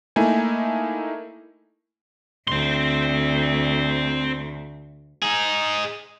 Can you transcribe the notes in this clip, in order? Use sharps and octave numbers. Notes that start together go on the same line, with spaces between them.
A3 A#3 D#4 E4 G#5
D2 C4 C6
D#4 G#4